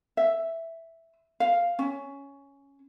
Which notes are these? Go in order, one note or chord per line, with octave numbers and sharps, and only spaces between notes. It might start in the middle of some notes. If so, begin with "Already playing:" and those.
E5
F5
C#4